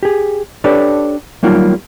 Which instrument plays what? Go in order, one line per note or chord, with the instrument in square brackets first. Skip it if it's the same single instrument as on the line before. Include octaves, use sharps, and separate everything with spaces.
[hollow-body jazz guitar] G4 G#4
D4 G4 A4 B4 C#5 D5
F#3 G3 A#3 D#4 F4